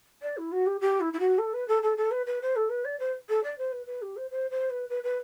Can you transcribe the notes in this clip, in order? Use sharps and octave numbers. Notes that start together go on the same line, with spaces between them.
D5
E4
F#4
G4
G4
E4
E4
F#4
A4
B4
A4
A4
A4
B4
B4
C5
A4
B4
D5
C5
A4
D5
C5
B4
B4
G4
C5
C5
C5
B4
B4
B4